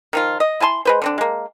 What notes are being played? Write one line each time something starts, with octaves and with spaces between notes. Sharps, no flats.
D#3 F3 F4
D#5
E4 G#5 A5 C6
G#3 B4 C5
D3 C4 D4
G#3 A#3